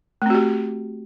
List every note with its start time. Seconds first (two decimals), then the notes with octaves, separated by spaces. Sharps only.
0.22 A3
0.26 C4
0.30 F#4
0.35 G4